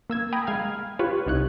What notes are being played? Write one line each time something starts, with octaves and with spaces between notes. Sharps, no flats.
A#3 E6 G#6
G5 G#5 A#5 B5 D#6
G#3 F5 F6 G#6
F4 G4 B4 C#5
C2 D#4 C#5 F#6